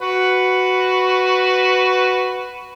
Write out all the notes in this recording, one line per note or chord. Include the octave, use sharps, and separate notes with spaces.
F#4 B4